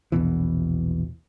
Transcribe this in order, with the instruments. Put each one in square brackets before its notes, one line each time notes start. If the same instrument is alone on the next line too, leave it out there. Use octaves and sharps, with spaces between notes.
[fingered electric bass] A#1 E2 B2 E3